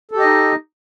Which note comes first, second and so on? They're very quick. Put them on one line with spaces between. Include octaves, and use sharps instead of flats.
A4 G4 D#5 D#4